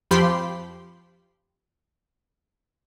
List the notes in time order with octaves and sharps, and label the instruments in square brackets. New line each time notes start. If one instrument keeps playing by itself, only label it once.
[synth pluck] F2 F3 G4 B5 C6